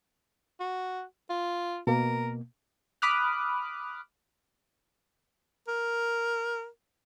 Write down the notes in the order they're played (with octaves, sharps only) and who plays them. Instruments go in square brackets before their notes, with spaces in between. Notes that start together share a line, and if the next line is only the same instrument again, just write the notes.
[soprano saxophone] F#4
F4
[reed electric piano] B2 A#3 [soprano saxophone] A#4
[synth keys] B5 D6 D#6 F6 F#6
[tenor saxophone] A#4